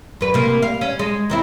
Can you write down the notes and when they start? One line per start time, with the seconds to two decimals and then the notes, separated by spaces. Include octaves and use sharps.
0.21 F#2 B4
0.34 C3 A#3
0.62 F5
0.81 C#4
0.99 G#3
1.30 D#2 C4 E4